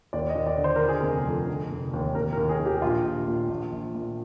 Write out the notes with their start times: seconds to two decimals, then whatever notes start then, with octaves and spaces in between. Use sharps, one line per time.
0.13 D#2 D5
0.30 D#5
0.35 D#2
0.46 D5
0.58 D3
0.64 C5
0.76 A#4
0.81 D3
0.89 G#4
1.00 F1 A#4
1.26 F2
1.47 D3
1.70 F1
1.93 D#2
2.15 D#2 A#4
2.33 A#4
2.37 D#2
2.49 G#4
2.60 D#3
2.66 G4
2.82 A#1 F4
3.05 A#1
3.28 A#2
3.49 A#1
3.72 A#1
3.95 A#2